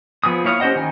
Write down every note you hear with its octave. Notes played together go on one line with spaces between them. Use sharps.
F3 B3 G#4 D#6
A#3 E4 C#5 F5 D#6
C#4 G4 C5 D#5 F#5
D#3 G#5